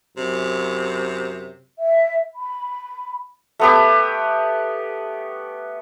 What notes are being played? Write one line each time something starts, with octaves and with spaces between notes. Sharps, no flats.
F#2 C3
E5
B5
A3 B3 G4